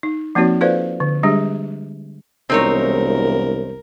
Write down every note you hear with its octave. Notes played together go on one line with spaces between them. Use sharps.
D#4
F3 A#3 C4 D#4 F#4 C#5
F4 A4 B4 C5 D5 F5
D3
G3 G#3 D4 G4 G#4
E1 C2 C4 D#4 A#4 C#5